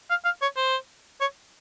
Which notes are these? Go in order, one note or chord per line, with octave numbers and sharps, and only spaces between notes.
F5
F5
C#5
C5
C#5